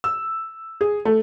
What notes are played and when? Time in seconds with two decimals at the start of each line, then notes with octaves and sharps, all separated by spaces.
0.04 E6
0.81 G#4
1.05 A3